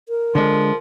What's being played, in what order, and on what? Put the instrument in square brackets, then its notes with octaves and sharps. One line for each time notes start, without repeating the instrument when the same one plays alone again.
[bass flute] A#4
[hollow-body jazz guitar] D3 G#3 [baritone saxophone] F3